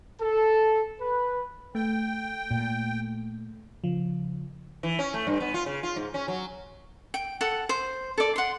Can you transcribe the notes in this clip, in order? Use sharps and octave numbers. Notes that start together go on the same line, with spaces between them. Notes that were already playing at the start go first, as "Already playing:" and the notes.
A4
B4
A3 G5
A#2
C#3 F3
E3
C#4
A3
G2
B3
F4
C#3
F4
G#2
C#4
F#3
G5
A4 F#5
C5
A4 D5
F#5 C6